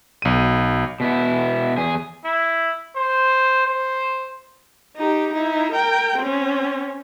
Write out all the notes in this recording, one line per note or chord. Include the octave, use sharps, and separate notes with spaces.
B1 D#7
B2 B3 E4
E2 G#4
E4
C5
C5
D#4 G4
D#4 E4
A#4 G5
C4 C#4